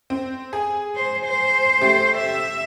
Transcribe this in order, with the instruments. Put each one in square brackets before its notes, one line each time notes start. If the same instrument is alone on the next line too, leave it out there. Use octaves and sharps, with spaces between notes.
[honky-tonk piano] C4
G#4
[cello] C5
C5
[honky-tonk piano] A3 G4
[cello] E5